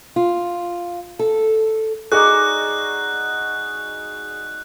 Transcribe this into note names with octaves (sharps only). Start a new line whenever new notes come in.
F4
A4
D#4 F#4 G#4 D5 F#6